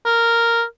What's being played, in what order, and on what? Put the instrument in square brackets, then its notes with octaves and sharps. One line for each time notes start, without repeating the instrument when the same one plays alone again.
[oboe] A#4